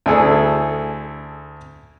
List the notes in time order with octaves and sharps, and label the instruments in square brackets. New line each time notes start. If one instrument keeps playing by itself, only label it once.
[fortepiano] D2 E4 G#4 A4